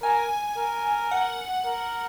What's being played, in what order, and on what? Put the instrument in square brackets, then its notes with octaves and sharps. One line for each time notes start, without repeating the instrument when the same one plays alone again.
[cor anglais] A#4 [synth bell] G#5
[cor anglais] A#4
[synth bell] F#5
[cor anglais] A#4